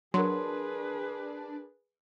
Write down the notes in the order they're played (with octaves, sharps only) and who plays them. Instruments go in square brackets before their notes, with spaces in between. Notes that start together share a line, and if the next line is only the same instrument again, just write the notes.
[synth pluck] F#3 [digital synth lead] D4 [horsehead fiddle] G#4 B4 [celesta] A#4 C6